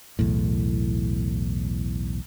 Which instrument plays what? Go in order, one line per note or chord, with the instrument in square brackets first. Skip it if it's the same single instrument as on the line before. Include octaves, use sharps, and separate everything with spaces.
[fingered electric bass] B1 E2 A2